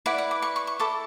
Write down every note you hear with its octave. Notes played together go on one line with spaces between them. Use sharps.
E4 B4 D5 F#5
F#5
D6
C#6
C#6
C#6
E4 A4 D6